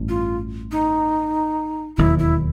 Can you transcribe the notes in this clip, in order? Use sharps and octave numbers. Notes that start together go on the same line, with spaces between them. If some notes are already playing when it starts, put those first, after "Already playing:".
Already playing: A1 G2
F4
D#4
E1 D#2 D#3 F#3 E4
E4